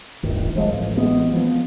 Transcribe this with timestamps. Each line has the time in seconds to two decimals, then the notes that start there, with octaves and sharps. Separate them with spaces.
0.23 D1 G1 D#3
0.56 F3 G#3
0.71 A1
0.97 E3 G#3 B3
1.32 F3 B3